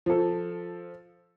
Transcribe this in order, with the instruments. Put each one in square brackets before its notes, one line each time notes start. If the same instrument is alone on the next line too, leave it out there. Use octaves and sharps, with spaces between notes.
[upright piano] F3 A4